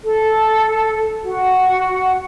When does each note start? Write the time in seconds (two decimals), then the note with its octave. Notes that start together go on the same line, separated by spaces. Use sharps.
0.04 A4
1.25 F#4 F#5